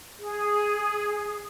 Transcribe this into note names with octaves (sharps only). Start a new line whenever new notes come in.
G#4